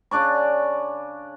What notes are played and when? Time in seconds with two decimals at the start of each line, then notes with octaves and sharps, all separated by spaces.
0.11 C#3 D4 D5 C#6